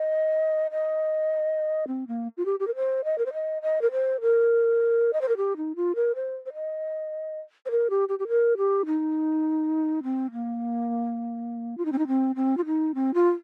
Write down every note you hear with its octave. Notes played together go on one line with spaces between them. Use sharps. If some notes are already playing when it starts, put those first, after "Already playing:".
Already playing: D#5
D#5
C4
A#3
F4
G4
G4
A#4
C5
D#5
A#4
C5
D#5
D#5
A#4
C5
A#4
D#5
C5
A#4
G4
D#4
F4
A#4
C5
C5
D#5
C5
A#4
G4
G4
G4
A#4
G4
D#4
C4
A#3
F4
D#4
C4
D#4
C4
C4
F4
D#4
C4
F4